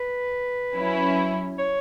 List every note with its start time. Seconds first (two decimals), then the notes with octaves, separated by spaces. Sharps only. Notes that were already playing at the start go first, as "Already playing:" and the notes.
Already playing: B4
0.76 F#3 C#4 E4
1.59 C#5